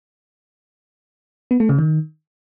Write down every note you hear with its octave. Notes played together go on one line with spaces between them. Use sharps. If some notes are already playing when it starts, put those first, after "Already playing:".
B3
A3
C#3
D#3